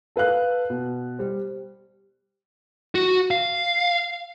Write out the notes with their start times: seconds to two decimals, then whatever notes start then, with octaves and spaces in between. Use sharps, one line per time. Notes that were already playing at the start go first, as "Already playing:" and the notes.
0.16 A4 B4 F5 F#6
0.70 B2
1.19 G3 C5
2.95 F#4
3.31 F5